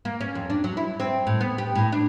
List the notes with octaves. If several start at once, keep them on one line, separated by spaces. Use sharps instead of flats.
A#3
C#4
F2
D4
F#3
E4
C4
A2
B3
G4
A2
D4